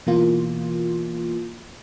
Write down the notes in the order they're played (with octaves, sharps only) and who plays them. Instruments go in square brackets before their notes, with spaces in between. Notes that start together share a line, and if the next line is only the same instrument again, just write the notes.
[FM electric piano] B2 E3 A#3 F4